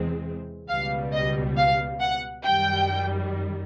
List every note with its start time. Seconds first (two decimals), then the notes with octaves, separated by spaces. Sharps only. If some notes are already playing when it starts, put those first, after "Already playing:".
Already playing: E2 C3 E3 G#3 C4
0.69 C#2 B2 G3 F5
1.13 D#5
1.57 F5
2.01 F#5
2.44 F#2 D#3 G3 G5